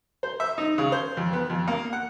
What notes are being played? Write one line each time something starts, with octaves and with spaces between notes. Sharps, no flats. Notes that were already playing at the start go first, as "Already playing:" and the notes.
C5
E5
D#4
C#3
C5
F2
B3
F2
A#3
F#5